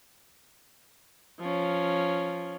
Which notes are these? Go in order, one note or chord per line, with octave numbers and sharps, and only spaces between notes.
F3 C#4